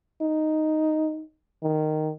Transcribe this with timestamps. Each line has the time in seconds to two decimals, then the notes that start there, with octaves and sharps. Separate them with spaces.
0.22 D#4
1.63 D#3